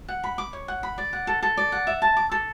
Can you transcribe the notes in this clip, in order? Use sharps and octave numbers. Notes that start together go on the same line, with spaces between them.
F#5
B5
D6
C#5
F#5
B5
D5
F#5
A4
A4
D5
F#5
E5
A5
D6
A4